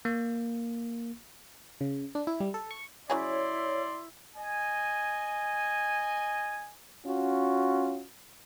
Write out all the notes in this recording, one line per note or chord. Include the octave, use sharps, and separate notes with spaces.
A#3
C#3
D4
E4
G3
A4
C#6
C#3 F#3 E4 G#4 C#5 D5 C6
D#5 G#5
C#4 F4 F#4